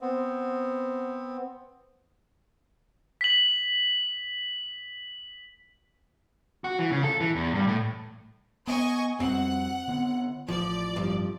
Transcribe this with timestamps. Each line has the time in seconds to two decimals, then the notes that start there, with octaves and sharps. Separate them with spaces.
0.01 B3 C4
3.21 B6 F#7
6.64 F#4
6.79 E3
6.91 C#3
7.04 A4
7.20 E3
7.36 E2
7.54 G2
7.67 A2
8.67 B3 D#5 G#5 C#6
9.20 F2 G3 C4 F#5
9.88 D3 B3
10.48 A1 F3 D5
10.96 G2 F3